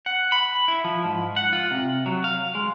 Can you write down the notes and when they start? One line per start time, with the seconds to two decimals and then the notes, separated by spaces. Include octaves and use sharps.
0.06 F#5
0.32 B5
0.68 E4
0.84 F3
1.04 G#2
1.36 F#5
1.53 F4
1.71 C3
2.06 F#3
2.24 F5
2.55 G#3